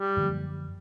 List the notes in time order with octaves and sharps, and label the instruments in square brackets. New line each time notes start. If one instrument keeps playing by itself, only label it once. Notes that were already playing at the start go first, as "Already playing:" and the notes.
Already playing: [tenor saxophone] G3
[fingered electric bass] F#2 D3 F3 A#3